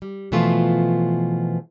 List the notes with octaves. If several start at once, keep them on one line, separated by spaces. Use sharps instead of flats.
G3
B2 E3 F3 A3 F4